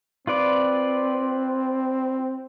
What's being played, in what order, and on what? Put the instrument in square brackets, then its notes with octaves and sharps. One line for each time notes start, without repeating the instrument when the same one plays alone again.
[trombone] C4 [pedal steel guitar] F4 B4 D5